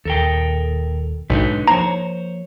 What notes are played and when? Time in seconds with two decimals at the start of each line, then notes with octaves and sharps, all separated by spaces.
0.05 D#1 D#2 A4 A#4 G5
1.30 B1 G#2 D3 D#4 B4
1.68 F3 A#3 C5 C#5 A#5